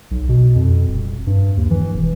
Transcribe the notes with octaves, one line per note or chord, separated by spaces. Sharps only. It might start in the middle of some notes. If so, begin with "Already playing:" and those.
B1
B2
F2
D#1
G2
D#2
E3
E1